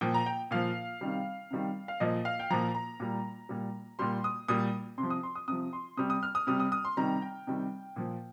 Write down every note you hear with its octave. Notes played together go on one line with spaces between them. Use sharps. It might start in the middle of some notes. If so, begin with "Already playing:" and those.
A#2 F3 G5
A#5
G5
A#2 F3 F5
C3 D#3 G3
C3 D#3 G3
F5
A#2 F3 D#5
F5
G5
A#2 F3 A#5
A#5
A#2 G3
A#2 G3
A#2 G3 C6
D#6
A#2 G3 D#6
C3 C6
F3
D#6
C6
D#6
C3 F3 D#6
C6
C3 G3 D#6
D#6
F6
D#6
C3 G3 D#6
D#6
D#6
C6
C3 D#3 G3 A#5
G5
C3 D#3 G3
A#2 F3